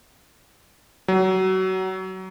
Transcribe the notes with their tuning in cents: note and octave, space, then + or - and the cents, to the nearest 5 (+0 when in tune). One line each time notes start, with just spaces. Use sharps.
F#3 +25